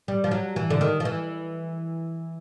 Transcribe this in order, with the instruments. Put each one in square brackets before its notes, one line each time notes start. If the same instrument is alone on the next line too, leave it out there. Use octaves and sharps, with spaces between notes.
[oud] G3
F3
F#3
E3
D3
D#3
F3
E3